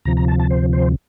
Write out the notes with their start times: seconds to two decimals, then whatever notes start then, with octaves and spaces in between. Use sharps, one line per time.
0.05 D2 C3 F3 A#5
0.17 A#5
0.28 A5
0.39 A5
0.50 C5
0.73 C5